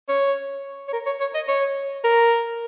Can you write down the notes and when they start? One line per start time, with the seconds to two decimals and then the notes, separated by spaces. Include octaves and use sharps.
0.09 C#5
0.88 C#5
0.93 A#4
1.06 C#5
1.20 C#5
1.34 D#5
1.48 C#5
2.04 A#4